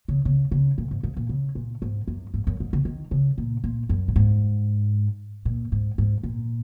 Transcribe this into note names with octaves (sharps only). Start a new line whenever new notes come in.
C#3
C#3
C#3
A#2
G#2
G#2
A#2
C#3
A#2
G#2
F#2
G#2
F#2
G#2
C#3
D#3
C#3
A#2
A#2
F#2
A#2
G#2
A#2
G#2
G#2
A#2